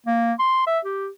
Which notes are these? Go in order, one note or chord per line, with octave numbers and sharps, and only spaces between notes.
A#3
C6
E5
G4